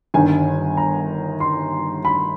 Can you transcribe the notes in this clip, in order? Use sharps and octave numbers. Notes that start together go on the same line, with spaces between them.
G1 G2 D#3 G#5
A#5
C6
B5